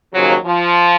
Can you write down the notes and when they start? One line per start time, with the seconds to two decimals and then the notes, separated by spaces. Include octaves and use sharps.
0.13 D#2 C#3 F3 F#3
0.45 F3